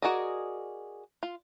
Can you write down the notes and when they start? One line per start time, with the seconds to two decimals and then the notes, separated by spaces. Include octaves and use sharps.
0.02 F#4 G#4 A#4 D5 D#5
1.23 F4